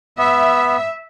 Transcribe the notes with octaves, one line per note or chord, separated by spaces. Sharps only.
B3 E5